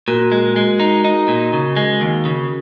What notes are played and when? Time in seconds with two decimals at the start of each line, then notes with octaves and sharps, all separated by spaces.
0.08 A#2 F#4 A#4
0.32 G#3
0.56 G#3
0.80 D#4
1.05 D#4
1.28 A#2
1.53 C#3
1.77 G#3
2.01 D#2
2.25 C#3